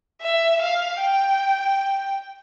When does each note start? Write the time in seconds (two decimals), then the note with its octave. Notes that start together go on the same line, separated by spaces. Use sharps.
0.22 E5
0.61 F5
1.01 G5